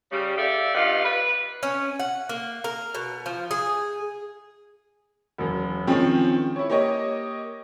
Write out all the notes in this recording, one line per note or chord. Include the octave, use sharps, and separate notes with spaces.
C#3 G3
G4 A4 D5 E5 F5
G2 D#4 F4 F5 F#5
B4
C#4
F#5
A#3
A#4
B2
F3
G#4
E1 F#2
D#3 F3 G#3 C4 C#4
E4 C#5
A#3 G4 C#5 D#5